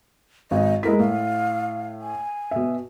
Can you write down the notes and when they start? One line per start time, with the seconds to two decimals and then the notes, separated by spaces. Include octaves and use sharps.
0.51 G#1 D#5
0.83 G#3 E4 A#4 B6
0.99 A2 F5
2.01 G#5
2.51 B2 E5